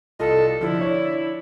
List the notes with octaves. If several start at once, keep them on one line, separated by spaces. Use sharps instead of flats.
C2 F4 A4 D#5
D3 F3 E4
D4 C#5